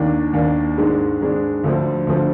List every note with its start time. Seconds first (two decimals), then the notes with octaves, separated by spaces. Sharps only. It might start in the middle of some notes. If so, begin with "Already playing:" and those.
Already playing: D#2 D#3 A#3 D4
0.33 D#2 D#3 A#3 D4
0.77 G#2 D#3 G#3 D4
1.21 G#2 D#3 G#3 D4
1.64 D2 D3 F3
2.07 D2 D3 F3